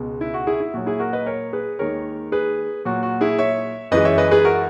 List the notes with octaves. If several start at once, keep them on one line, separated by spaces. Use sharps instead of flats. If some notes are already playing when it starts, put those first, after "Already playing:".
Already playing: C#2 B2 G#3
E4
F#4
E4 G#4
E4
A#2 F#3 F#4
E4 G#4
F#4 A#4
B4 D#5
A#4 C#5
G#4 B4
D#2 D#3 G#3 A#4 C#5
G#4 B4
A#2 F#3 F#4
F#4
E4 G#4
C#5 E5
F#2 E3 G#3 B4 D#5
C#5 E5
B4 D#5
G#4 B4
F#4 A#4